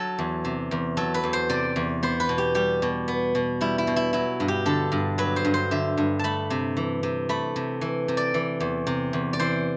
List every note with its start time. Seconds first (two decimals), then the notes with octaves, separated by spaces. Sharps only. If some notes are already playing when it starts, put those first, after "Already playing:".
Already playing: F#3 A4
0.18 E2
0.45 C3
0.71 E2
0.97 F#3 A4
1.14 B4
1.24 E2
1.33 C5
1.49 C3 D5
1.76 E2
2.03 B3 C5
2.20 B4
2.29 B2
2.38 G4
2.55 G3 G4
2.82 B2
3.08 B3
3.35 B2
3.61 G3 E4
3.78 E4
3.87 B2
3.96 E4
4.13 F#3 E4
4.40 G2
4.48 G4
4.66 D3 A4
4.92 G2
5.18 F#3 B4
5.36 C5
5.45 G2
5.54 C5
5.71 D3 E5
5.97 G2
6.19 A3 A5 B5
6.50 C3
6.77 E3
7.03 C3
7.29 A3 B5
7.56 C3
7.81 E3
8.08 C3
8.17 D5
8.34 E3
8.60 E2
8.87 C3
9.13 E2
9.33 D5
9.39 E3 C5